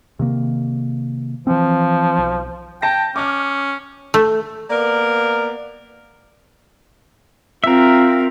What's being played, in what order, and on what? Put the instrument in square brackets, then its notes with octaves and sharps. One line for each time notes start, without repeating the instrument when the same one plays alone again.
[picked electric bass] C3 D#3 A#3
[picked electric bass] E3 C4 [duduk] F3
[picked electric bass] B1
[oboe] G5 [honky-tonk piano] A5 A#6
[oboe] C#4 [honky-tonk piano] D6 F6
[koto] A3
[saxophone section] A#3 B3 A#4 D5
[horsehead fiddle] C4 F4 [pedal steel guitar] A#4 E5